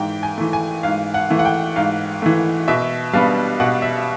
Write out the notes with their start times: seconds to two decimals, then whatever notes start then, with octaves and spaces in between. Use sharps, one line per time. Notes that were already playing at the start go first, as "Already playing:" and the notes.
Already playing: G#2 E3 G5
0.23 G#5
0.38 E3 A3
0.53 G#5
0.83 G#2 F5
1.14 F#5
1.30 E3 A3
1.39 F#5
1.45 G5
1.76 G#2 F5
2.22 E3 A3
2.68 B2 E5
3.13 G3 B3 D4 F5
3.60 B2 F#5
3.82 E5